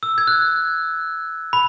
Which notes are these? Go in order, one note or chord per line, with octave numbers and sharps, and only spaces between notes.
E6
G#6
F#6
B5